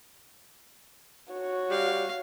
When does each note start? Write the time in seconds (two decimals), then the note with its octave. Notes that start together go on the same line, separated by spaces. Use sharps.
1.31 F#4 C#5
1.71 G3 F5